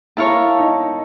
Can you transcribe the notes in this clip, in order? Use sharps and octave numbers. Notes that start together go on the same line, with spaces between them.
E4 A#4 C#5 F5 A5
D#4